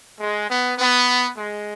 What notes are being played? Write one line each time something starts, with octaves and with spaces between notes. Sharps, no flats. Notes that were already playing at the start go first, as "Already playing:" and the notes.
G#3
B3
B3
G#3